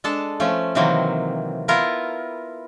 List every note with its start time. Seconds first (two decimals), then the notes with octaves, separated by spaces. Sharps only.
0.04 G#3 D4 A4 A5
0.40 F3 A3 C#4
0.75 C3 D#3 E3 F#3 A#3 C4
1.68 B3 E4 F4 A#4